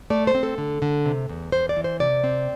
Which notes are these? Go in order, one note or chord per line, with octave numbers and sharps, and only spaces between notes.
A3 D5
C5
C4
A4
D3
D3
C3
E2
E2 C5
D5
E3
C5
C3 D5
C4